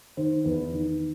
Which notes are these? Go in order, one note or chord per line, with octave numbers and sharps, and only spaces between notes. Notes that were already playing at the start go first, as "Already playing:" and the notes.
D#3 C5
E2 B4
D#3